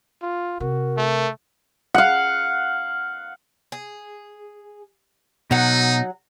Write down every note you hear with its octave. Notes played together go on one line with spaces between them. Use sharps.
F4
C3 F#4 A#4
A3
F5 F#5
G#4
B2 F#3 D#4 F#5